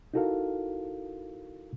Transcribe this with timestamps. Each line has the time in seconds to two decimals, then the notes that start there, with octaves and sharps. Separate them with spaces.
0.14 D#4 E4 F#4 A4 A#4 F5